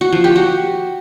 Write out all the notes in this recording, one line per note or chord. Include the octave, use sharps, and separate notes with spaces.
F#4
F3
G4
F#4